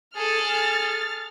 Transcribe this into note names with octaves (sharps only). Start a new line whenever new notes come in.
G#4 A4 F6 A6